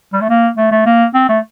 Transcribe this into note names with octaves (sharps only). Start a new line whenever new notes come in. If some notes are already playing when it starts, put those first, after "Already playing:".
G3
A3
A#3
A3
A3
A#3
C4
A3